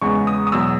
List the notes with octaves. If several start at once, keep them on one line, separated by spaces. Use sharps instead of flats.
E2 C#3 G#3 B3 C#6
D#6
D#6
E2 B2 F#3 E6